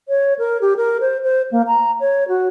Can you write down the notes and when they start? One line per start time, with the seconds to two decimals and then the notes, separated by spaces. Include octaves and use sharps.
0.08 C#5
0.39 A#4
0.61 G4
0.76 A#4
1.00 C5
1.23 C5
1.51 A#3
1.67 A#5
2.00 C#5
2.28 F#4